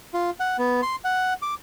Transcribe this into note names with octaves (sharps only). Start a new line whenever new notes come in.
F4
F#5
B3
C6
F#5
D6